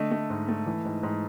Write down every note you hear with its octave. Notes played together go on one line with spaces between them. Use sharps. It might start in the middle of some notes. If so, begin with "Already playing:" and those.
Already playing: D3 A3 D#5
A3
G#2
A3
E3
G#2
G#2